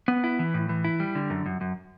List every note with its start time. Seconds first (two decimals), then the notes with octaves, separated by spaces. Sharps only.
0.08 B3
0.24 E4
0.39 E3
0.54 A2
0.69 E3
0.84 E4
1.00 G3
1.15 D3
1.30 F#2
1.46 F#2
1.61 F#2